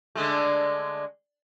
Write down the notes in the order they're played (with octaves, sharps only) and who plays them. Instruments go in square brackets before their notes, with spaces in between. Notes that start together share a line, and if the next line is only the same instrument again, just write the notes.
[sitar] D3 G#3 A3